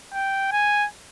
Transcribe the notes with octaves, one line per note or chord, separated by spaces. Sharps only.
G5
G#5